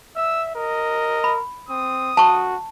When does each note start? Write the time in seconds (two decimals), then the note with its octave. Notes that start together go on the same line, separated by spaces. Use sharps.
0.16 E5 E6
0.55 A#4 D#5
1.24 B5
1.69 C4 D#6
2.17 F#4 A5 C#6